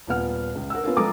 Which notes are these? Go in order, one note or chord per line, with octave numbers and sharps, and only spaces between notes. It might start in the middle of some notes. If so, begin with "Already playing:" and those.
D#1 A#2 B3 F#5 F6
C#2
A#4 F#5 E6
B3 C#4 F4 A#4
F3 G#3 A4 A#5 D6 D#6